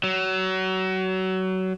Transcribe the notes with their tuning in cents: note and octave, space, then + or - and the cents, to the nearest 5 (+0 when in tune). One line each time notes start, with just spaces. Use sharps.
F#3 +25